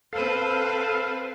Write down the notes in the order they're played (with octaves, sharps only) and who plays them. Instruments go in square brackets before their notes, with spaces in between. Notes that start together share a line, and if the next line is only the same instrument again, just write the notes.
[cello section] C4 B4 C5 [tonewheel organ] A4 F5